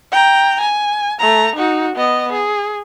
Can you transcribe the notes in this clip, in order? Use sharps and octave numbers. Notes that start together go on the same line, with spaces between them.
G5 A#5
G#5
A3 A#5
D#4 F#4
B3 D#5
G#4